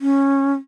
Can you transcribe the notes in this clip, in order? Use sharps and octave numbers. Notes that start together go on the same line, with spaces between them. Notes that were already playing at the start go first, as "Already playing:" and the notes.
C#4